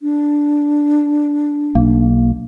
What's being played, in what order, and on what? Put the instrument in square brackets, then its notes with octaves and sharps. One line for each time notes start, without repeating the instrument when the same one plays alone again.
[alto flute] D4
[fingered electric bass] B1 [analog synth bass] A#3